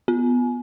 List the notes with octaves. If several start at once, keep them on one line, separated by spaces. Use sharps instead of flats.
B3